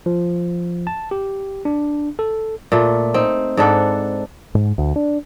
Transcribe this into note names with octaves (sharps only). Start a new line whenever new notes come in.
F3
A5
G4
D4
A4
A#2 A3
C4 D#4
G#2 D4 A4 F#5
G#2
D2
D4